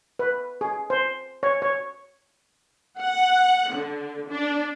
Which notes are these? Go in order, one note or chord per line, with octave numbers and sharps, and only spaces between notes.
B4
G#4
C5
C#5
C#5
F#5
D3
D4